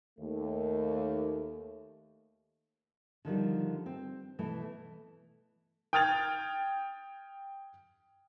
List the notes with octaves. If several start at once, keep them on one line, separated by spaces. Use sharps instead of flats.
D#2 A3
D3 D#3 F3 G3
C4
B2 E3 A3
G5 D#6 F6 G#6 A6 F7